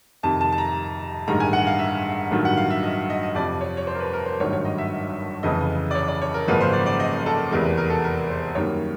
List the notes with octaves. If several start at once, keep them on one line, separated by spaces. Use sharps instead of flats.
F2 C3 D#3 A5
A5
A5
A#5
A1 G2 D#3 G#3 A#5
G#5
F#5
F5
E5
A1 G2 D#3 F#3 A3
F#5
F5
E5
D#5
D#5
D#5
F2 C3 F3 D5
C#5
C#5
C5
A#4
B4
A#4
C5
G#1 G2 D#3 F#3 A3 C#5
C#5
D#5
E5
F1 F2 C#3 E3 D#5
D5
C#5
D5
C#5
A#4
G#1 F#2 C#3 F3 A#3 B4
C5
D5
D5
D#5
A4
F1 E2 C3 E3 G#3 A#4
B4
A#4
A4
A#4
C5
F#2 D#3 G3 A#3 C#5